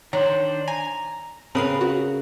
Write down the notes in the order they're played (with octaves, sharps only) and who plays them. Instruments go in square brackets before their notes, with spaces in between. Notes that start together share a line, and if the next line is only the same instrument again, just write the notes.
[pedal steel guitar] D#3 D4 C5 [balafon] C#5 [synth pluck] A#5
[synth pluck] G#5 [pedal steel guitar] A#5
[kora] C#3 A#4 B4 [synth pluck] C4 D#6 C7
[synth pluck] F#4